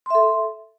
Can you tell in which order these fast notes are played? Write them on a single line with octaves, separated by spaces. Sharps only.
C6 E5 A4